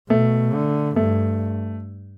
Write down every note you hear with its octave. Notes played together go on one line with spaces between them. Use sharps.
B2 A3
D3
G2 A3